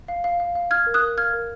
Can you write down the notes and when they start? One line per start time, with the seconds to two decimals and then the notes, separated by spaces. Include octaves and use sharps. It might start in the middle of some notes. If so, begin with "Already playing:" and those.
0.08 F5
0.24 F5
0.40 F5
0.55 F5
0.71 F5 F6 G#6
0.87 A#4
0.94 D#6 F#6
1.02 A#4
1.18 F5 F6 G#6
1.33 A#4